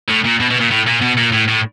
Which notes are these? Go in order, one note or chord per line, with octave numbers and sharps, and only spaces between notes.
A2
A#2
B2
B2
A#2
A2
A#2
B2
A#2
A2
A2